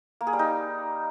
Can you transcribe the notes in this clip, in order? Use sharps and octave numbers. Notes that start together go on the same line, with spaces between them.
A#3
G#4
G3
D#4